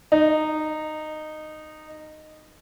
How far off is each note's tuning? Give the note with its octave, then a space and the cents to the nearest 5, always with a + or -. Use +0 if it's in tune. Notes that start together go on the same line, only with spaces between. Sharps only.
D#4 -15